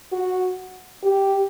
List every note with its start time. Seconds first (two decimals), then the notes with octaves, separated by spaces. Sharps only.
0.12 F#4
1.03 G4